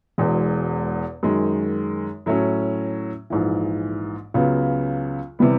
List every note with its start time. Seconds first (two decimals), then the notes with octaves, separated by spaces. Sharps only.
0.18 E1 E2 B2 G#3
1.23 F#2 D#3 G#3
2.26 A2 F#3 A3 C#4
3.30 A#1 G#2 E3
4.34 C#2 C#3 F#3 B3
5.39 C3 E3 G3 B3